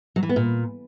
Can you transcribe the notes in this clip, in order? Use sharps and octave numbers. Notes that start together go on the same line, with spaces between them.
F#3
E3
B3
A#2